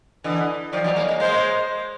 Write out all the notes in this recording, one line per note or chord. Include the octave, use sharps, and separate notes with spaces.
D3 E3 D#5
D#3 F3 D5
E3 F#3
G#3 A#3
G#3 A#3
G#3 A#3 C5